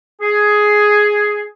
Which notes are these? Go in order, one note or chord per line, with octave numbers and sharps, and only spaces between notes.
G#4